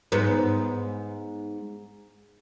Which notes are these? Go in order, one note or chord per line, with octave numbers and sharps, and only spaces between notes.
G#2 B3